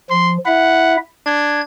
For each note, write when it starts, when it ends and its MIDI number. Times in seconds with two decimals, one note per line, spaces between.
0.10 0.38 53
0.10 0.33 84
0.46 0.97 64
0.46 0.97 76
0.46 0.98 78
1.26 1.62 62
1.26 1.61 92